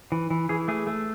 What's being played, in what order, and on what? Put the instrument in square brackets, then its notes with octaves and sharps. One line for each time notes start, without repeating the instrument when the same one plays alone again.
[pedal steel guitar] E3
E3
E3 G#4
A3 G#4
A3